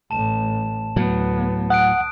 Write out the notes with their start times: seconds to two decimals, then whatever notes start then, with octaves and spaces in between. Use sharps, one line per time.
0.11 A1 A2 A5 E7
0.96 D2 A2 F#3 B3
1.70 F#5 D#6 F#6 D7